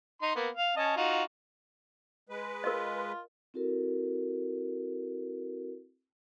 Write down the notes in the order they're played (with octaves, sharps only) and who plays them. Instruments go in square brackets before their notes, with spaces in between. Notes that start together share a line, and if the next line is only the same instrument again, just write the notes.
[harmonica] D#4 C6
A#3 B3
F5
C#4 D#5 A5
D#4 F4 F#4
[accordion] G#3 B4
[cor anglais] F4 [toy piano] A#4 D#5
[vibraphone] C4 E4 F#4 A4 A#4